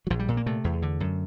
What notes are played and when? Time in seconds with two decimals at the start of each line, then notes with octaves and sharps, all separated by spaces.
0.07 F#3
0.10 A#1 F3
0.19 G3
0.28 A#2
0.37 A#3
0.46 C3 A3
0.64 E2
0.82 D3
1.00 F#2